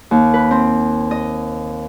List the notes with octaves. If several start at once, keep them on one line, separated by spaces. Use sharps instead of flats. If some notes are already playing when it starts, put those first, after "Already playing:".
D#2
B4
C4
D#5